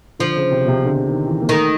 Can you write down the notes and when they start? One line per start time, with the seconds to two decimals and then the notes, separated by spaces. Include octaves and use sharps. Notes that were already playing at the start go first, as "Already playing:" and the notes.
0.19 D3 F3
0.36 C#3
0.52 C3
0.65 B2
0.68 C3
0.85 D3
1.07 D#3
1.27 E3
1.41 A#3
1.49 D#3 A3